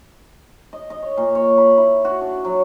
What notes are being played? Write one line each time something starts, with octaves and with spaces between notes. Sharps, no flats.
D#5
D#5
C#5
A#2
C#5
B5
E4
F#4
D4
F#3